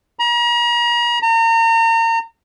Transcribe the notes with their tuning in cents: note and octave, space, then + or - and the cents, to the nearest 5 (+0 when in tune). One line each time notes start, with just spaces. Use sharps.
A#5 +40
A#5 -35